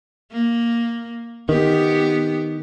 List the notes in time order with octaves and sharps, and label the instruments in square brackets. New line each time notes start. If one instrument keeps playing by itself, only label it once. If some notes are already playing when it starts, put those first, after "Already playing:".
[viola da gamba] A#3
[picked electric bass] D#3 [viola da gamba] B3 G4